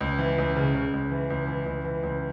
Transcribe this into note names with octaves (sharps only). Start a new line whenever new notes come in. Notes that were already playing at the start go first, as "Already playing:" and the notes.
C#2
E3
C#2
C#3
C#3
C#2
E3
C#2
E3
C#2
E3
C#2